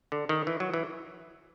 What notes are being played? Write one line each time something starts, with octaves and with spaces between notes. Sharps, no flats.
D3
D#3
E3
F#3
E3